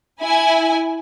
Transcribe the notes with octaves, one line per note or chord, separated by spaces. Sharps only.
E4 G#5